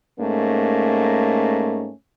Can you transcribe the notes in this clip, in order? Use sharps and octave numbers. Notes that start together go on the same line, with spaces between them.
G#2 A3 A#3 C#4